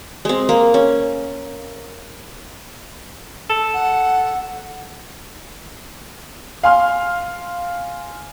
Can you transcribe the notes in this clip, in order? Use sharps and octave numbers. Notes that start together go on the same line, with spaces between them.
G#3 C4
A#3
C#4
A4
F#5
F5 G#5 C6 F6